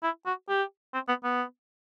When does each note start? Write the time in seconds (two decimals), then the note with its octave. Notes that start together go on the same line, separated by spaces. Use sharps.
0.03 E4
0.26 F#4
0.49 G4
0.94 C4
1.08 B3
1.24 B3